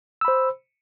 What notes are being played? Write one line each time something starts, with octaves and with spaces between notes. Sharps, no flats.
C5 B5 E6